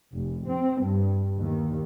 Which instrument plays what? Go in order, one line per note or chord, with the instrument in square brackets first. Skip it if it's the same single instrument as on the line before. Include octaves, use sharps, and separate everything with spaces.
[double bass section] F1
C4
G2
D#2